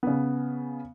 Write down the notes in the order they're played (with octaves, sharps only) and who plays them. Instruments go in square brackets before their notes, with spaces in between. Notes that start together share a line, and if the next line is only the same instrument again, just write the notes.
[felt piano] C#3 B3